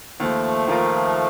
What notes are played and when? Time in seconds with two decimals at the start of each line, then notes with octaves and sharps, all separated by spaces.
0.20 D#2 F3 A3
0.67 D#3 A#3 F4 A#4